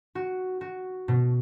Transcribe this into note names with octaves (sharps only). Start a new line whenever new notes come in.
F#4
F#4
B2